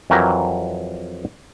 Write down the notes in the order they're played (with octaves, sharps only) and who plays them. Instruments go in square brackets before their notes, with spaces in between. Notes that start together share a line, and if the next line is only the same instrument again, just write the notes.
[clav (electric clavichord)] F2 E3 F#3 G4 A#4